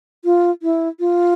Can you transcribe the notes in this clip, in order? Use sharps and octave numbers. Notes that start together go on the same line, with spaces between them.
F4
E4
F4